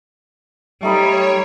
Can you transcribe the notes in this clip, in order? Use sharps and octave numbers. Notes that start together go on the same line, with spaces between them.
G3 A3 D#4 C#5 B5